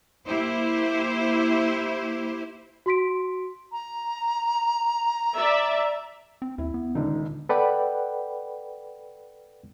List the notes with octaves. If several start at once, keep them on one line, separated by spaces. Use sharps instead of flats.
A#3 E4 G4 C5
F#4 C6 B6 D7
A#5
D5 E5
C4
D#2 E4
B3
D#1 C#2 D3 D#4
A4 B4 D5 F#5 G5 B5